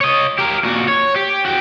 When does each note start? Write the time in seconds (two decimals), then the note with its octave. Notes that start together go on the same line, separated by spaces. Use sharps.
0.01 C#5 D#5
0.38 G4 A#4
0.64 A#2 F#4
0.88 C#5
1.16 G4
1.46 F#4 G5